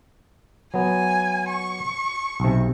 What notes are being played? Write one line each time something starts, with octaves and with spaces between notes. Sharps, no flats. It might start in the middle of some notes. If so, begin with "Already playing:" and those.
F#3 B3 G#5
C#6
B1 C3